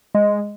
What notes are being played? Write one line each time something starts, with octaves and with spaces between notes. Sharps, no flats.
G#3